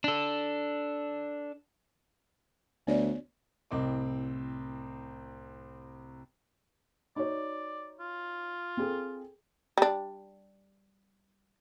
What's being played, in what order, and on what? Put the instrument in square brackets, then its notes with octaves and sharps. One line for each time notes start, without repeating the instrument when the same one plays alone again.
[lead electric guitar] D4 A4
[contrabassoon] D2 [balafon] B3 C#5 D5
[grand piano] C2 A2 C4 D#5 D6
[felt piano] D#4 F#4 C#5 [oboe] D5
[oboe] F4
[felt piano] C4 G#4 A4
[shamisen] G3 D4